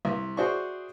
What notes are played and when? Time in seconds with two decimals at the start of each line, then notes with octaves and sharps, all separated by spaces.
0.05 C2
0.37 F#4 G#4 C5 D5 E5 C#6